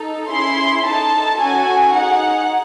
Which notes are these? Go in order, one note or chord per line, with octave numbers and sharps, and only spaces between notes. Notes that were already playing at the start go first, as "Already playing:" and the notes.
Already playing: D#4 A4
C#4 E4 G#4 C6
D#4 A4 A5
C#4 F#4 A4 G#5
D#4 G#4 F#5